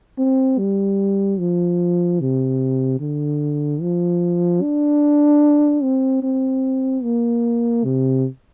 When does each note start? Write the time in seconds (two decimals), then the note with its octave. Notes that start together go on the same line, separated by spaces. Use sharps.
0.18 C4
0.59 G3
1.39 F3
2.20 C3
3.00 D3
3.82 F3
4.62 D4
5.83 C4
6.23 C4
7.03 A#3
7.84 C3